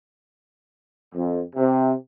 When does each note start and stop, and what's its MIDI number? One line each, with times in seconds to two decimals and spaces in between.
1.13 1.39 41
1.56 1.91 48